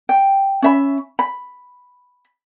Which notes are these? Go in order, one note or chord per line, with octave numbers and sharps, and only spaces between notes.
G5
C#4 E5 B5
B5